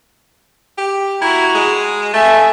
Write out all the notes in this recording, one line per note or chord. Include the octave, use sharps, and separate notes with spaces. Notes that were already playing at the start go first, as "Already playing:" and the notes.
G4
E4 F#4 A#5
G#3
A3 E5 G#5